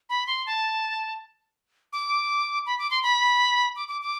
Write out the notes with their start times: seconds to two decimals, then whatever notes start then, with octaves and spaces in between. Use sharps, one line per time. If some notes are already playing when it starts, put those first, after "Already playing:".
0.10 B5
0.27 C6
0.46 A5
1.93 D6
2.66 B5
2.79 D6
2.91 C6
3.03 B5
3.76 D6
3.88 D6
4.02 D6